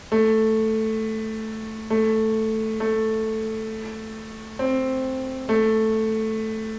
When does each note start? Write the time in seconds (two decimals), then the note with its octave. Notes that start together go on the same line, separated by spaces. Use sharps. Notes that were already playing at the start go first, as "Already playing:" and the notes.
0.12 A3
1.90 A3
2.80 A3
4.59 C4
5.49 A3